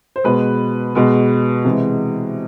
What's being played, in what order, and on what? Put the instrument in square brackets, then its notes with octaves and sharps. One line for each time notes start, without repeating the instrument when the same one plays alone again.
[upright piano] C5
B2 G#3 B4
B2 G#3
C3 E3 G#3